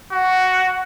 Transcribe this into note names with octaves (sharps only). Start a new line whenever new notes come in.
F#4 F#5